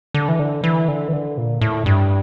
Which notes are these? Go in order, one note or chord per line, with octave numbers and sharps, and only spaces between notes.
D3
E3
D3
E3
D3
E3
D3
A#2
A2
G2